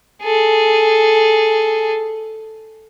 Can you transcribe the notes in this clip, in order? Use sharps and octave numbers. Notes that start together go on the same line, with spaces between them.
G#4 A4